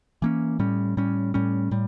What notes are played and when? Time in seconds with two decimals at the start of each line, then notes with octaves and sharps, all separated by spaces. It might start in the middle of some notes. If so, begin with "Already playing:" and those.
0.22 E3 A#3 C#4
0.59 A2 G3 C#4
0.97 A2 G3 C#4
1.34 A2 G3 C#4
1.71 A2 G3